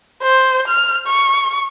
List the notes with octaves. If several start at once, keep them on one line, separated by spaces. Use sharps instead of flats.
C5
F6
C#6